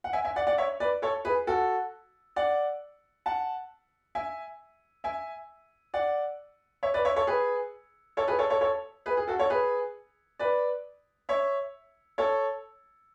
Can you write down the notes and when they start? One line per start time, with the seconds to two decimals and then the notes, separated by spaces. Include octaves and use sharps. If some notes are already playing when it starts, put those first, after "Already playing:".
0.04 F#5
0.13 E5 G#5
0.25 E5 G#5
0.36 D5 F#5
0.47 D5 F#5
0.58 C#5 E5
0.80 B4 D5
1.02 A4 C#5
1.25 G#4 B4
1.47 F#4 A4
2.36 D5 F#5
3.26 F#5 A5
4.15 E5 G#5
5.04 E5 G#5
5.94 D5 F#5
6.83 C#5 E5
6.94 B4 D5
7.05 C#5 E5
7.16 A4 C#5
7.27 G#4 B4
8.17 A4 C#5
8.28 G#4 B4
8.39 A4 C#5
8.50 A4 C#5
8.61 A4 C#5
9.06 G#4 B4
9.17 G#4
9.28 F#4 A4
9.39 A4 C#5
9.50 G#4 B4
10.39 B4 D5
11.29 C#5 E5
12.18 A4 C#5